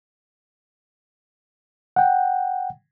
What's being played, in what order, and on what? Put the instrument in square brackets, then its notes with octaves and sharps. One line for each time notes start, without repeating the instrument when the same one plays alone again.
[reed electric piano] F#5 G5